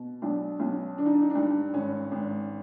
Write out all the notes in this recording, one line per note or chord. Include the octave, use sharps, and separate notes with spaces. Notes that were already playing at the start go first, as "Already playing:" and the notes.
Already playing: B2
B1 D4
B1 C#4
D3 D4
D#4
D4
D#4
D4
G2 D#4
D4
G#1 C#4
G#1